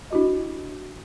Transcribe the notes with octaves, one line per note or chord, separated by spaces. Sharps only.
D4 E4 F#4 G4 D#5